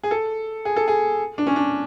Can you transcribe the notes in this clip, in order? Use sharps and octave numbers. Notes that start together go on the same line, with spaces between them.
G#4
A4
G#4
A4
G#4
D4
C#4
D4